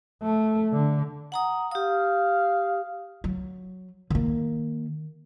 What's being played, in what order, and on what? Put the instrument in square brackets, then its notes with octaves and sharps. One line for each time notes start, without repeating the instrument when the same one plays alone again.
[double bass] A3
D3
[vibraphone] F#5 A#5 D#6
[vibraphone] G4 D#6 [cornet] F5
[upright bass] F#3
D#3 A#3